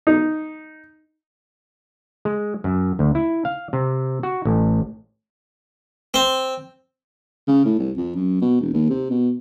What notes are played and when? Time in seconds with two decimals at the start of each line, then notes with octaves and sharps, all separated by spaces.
0.07 D#4
2.25 G#3
2.64 F#2
2.99 D2
3.15 E4
3.45 F5
3.73 C3
4.23 F#4
4.45 A1
6.14 C4
7.47 C#3
7.65 A2
7.79 C2
7.97 F2
8.16 F#2
8.41 B2
8.61 E1
8.74 D#2
8.90 C3
9.10 B2